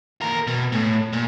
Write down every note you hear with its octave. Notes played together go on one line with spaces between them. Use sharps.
D#2 A#4
B2
A2
A#2